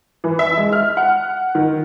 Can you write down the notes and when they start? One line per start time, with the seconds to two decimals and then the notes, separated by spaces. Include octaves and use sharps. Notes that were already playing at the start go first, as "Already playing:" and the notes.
0.24 E3
0.39 E5
0.57 G#3
0.72 F6
0.97 F#5
1.55 D#3